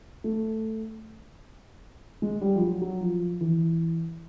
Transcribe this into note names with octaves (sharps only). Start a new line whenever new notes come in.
A3
G#3
G3
F3
F#3
F#3
F3
E3